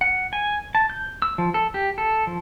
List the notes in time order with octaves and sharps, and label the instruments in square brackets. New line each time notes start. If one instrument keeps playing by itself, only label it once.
[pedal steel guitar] F#5
G#5
A5
G6
E6
F3
A4
G4
A4
F3